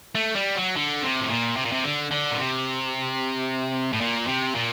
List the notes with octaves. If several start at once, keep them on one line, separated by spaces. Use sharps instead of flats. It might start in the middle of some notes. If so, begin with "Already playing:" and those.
A3
G3
F#3
D3
C3
A2
A#2
C3
A#2
C3
D3
D3
A#2
C3
A2
A#2
C3
A#2